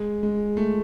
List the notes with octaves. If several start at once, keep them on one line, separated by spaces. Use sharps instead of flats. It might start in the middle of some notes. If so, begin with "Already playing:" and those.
Already playing: G#3
G#3
A3